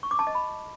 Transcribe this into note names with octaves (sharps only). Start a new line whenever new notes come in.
C#6
D6
A5
D#5
B5